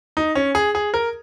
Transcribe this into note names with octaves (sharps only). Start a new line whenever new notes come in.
D#4
C#4
G#4
G#4
A#4